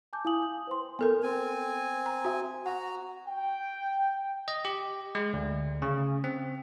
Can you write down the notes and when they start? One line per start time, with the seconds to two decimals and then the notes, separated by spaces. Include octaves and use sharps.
0.13 G#5 A5 D6 G6
0.25 E4 F5 G#5 D#6 F#7
0.42 D#6
0.67 B4 C5 G5 C6
0.99 B3 A4 A#4
1.23 C4 G#5
2.06 A#5
2.25 F#4 E5
2.66 F#4 F#5 A#5
3.27 G5
4.48 D#5
4.65 G4
5.15 G#3
5.33 D2
5.82 C#3
6.24 C4